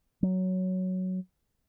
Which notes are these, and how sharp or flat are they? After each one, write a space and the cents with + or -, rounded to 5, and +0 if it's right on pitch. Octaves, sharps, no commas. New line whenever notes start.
F#3 +5